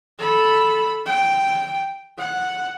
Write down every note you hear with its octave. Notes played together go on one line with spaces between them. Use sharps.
A4 B5
G5
F#5